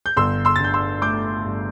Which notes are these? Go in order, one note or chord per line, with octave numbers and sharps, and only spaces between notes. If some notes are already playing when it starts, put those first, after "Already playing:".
G6
G1 C6 E6
C6 E6
A6
D3 G6
C6 E6
A3 D6 G6
G2